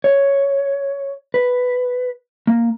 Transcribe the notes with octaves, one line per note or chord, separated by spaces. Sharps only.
C#5
B4
A#3